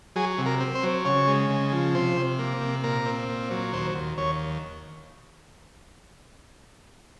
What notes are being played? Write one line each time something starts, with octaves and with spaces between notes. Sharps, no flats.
F#3 G#4
C3
A#4
C4
C5
F#3
C#3 C#5
G#3
C#3
F3
C3 C5
C3
A#3
C3
A#2 A#4
C4
A#2
F#3
D#2 C5
D#2
D#2 C#5